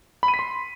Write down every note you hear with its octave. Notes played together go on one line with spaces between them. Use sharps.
B5
D#7
B6
C6